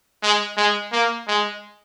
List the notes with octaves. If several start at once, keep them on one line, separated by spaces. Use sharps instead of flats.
G#3
G#3
A#3
G#3